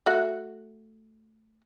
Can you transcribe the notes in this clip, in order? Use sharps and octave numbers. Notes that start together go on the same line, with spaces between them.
A3 F#4 F#5